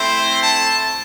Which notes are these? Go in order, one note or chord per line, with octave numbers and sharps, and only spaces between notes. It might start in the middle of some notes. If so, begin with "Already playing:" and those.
Already playing: A3 C4 E4 C5
A5